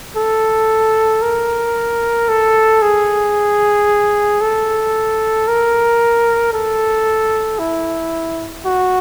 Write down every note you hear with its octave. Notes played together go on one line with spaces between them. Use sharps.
A4
A#4
A4
G#4
A4
A#4
A4
E4
F#4